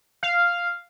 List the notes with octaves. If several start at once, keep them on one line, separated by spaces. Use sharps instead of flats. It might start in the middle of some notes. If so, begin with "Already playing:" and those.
F5